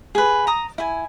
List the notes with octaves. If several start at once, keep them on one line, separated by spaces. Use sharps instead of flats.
G#4 B4
A#5 D#6
E4 G#5